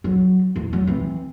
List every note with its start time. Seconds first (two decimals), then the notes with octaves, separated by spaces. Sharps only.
0.04 F#3
0.56 E2
0.73 F#3
0.87 E3 C4